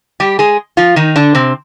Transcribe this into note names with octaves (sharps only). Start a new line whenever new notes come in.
G3 G4
G#3 G#4
F3 F4
D#3 D#4
D3 D4
C3 C4